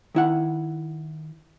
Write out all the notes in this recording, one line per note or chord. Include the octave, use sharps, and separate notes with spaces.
D#3 E4 F#5